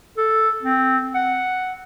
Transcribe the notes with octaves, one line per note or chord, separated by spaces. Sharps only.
A4
C4
F#5